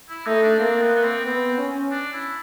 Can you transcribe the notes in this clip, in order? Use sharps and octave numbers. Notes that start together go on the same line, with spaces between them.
E4
A3 D#4
D4
A#3 C4
B3
B3
C4
B3 C4
C#4
D4
E4